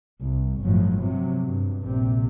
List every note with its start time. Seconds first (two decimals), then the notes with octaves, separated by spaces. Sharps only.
0.21 C2
0.62 G1 A2 F3 F#3
1.01 C3 F#3
1.45 G2
1.84 A#1 C3